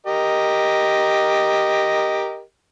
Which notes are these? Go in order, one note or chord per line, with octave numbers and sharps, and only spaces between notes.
G4 A#4 D#5